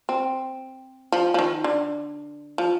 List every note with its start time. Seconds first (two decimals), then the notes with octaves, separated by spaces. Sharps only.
0.09 C4
1.12 F3
1.34 F3
1.39 D#3
1.64 D3
2.58 F3